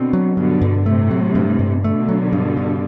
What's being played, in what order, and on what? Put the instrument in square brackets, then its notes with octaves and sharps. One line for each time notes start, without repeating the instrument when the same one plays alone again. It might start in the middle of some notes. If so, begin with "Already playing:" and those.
Already playing: [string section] B2 D3 [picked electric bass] C4
[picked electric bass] F#3
[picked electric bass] G2 [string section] B2 D3
[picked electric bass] G2
[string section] A2 C3 [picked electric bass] A3
[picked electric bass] F#3
G2
G2
[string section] B2 D3 [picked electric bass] A3
[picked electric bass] F#3
G2
G2